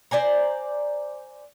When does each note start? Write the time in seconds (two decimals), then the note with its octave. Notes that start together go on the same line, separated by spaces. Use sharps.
0.11 C5 D5 G#5 A#5